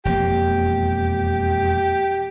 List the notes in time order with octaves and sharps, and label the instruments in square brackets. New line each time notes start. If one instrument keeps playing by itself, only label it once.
[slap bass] E1 F2 A#3 [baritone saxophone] G4